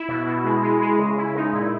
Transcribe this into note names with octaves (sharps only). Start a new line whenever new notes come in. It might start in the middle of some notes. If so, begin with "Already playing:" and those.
Already playing: E4
B2
B2
G#3
G#3
G#3
C#3
C#3 E4
G#3 D#4
A#2 E4